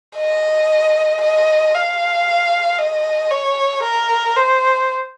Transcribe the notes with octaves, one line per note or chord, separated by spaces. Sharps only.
D#5
D#5
F5
D#5
C#5
A#4
C5